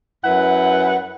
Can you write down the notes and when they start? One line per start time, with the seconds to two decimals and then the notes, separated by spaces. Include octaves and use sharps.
0.24 F#2 E4 B4 F#5